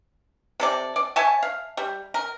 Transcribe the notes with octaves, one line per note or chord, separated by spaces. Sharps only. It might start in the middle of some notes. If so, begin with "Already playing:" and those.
C3 A4 D5
D5
C#5 E5 G#5 A5
F5
G3
A#4